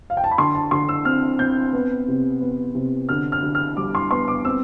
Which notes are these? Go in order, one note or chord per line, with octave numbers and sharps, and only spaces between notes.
F5
G5
A5
B5
D3 C6
A5
D3 C6
E6
C4 F6
C4 G6
B3
C3
B3
C3
D3 F6
F6
D3
F6
G3 D6
C6
B3 C6
D6
C4 E6